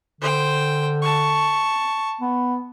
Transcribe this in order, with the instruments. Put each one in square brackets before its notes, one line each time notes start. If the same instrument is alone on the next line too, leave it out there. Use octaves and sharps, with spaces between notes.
[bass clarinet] D3 [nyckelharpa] C5 G5
[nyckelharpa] A5 C#6
[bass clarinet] B3